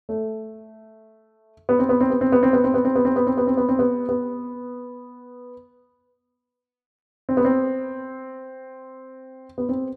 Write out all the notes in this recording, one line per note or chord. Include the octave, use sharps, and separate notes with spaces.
A3
B3
C4
B3
C4
B3
C4
B3
C4
B3
C4
B3
C4
B3
C4
B3
C4
B3
C4
B3
C4
B3
B3
C4
B3
C4
B3
C4